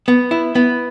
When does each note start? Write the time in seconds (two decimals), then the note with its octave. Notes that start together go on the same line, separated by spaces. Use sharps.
0.08 B3
0.31 E4
0.55 B3